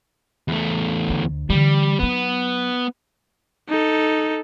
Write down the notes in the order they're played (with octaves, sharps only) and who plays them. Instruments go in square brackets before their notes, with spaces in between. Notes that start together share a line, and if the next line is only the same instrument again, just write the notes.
[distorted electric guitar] E2 A3
[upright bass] D2 D4
[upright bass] D3 E3 [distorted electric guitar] G3
[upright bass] F#3 D#4 [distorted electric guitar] B3
[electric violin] D#4 A4